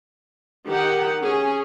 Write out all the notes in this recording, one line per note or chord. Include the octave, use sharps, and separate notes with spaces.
D#3 G4 F#5
C#4 G#4